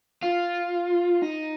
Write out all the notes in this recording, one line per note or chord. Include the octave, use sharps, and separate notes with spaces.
F4
D#4